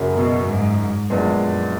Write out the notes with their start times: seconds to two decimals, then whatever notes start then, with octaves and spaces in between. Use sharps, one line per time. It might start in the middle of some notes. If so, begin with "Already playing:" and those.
Already playing: F#2 C#3 F#3 A#3
0.13 B2
0.46 G#2
0.77 G#2
1.09 A#1 F#2 A#2 G#3 B3
1.41 F#2